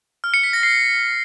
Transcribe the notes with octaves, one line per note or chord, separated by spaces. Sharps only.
F6
C#7
B6
A#6
C7